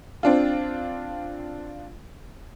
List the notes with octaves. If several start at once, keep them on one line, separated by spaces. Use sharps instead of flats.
C4 D4 F4